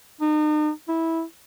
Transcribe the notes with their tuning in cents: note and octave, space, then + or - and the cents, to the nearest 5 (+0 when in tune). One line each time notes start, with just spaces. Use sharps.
D#4 -40
E4 -15